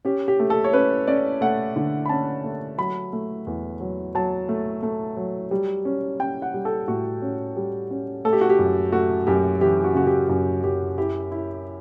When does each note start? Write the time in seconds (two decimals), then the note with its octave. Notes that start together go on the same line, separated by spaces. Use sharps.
0.05 C#4 G4
0.28 G4
0.39 A3
0.50 A4
0.64 C#5
0.73 C#4 B4
1.07 C#4 D5
1.41 A3 F#5
1.76 D3
2.06 B5
2.09 C#4 A5
2.44 A3
2.78 F#3 B5
3.13 A3
3.47 E2
3.80 F#3
4.15 F#3 A5
4.49 A3
4.83 A3
5.17 F#3
5.51 G3
5.85 C#4
6.19 C#4 G5
6.42 F#5
6.54 G3
6.65 A4
6.88 A2 F#4
7.22 C#4
7.56 G3
7.90 C#4
8.25 A3 A4
8.33 G4
8.41 F#4
8.50 G4
8.59 F#2
8.92 A3 F#4
9.27 F#2 G4
9.61 E3 G4
9.84 F#4
9.95 C#3 F#4
10.07 G4
10.29 F#2
10.64 F#2 G4
10.98 E4 G4
11.32 E4